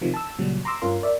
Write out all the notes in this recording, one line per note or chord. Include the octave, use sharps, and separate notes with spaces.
C3 D#3 F3
A5 E6
A#2 C#3 F#3 G3
A#5 C6 D6 E6
G2 C#4 F4 A#4 C6
A#4 D5 E5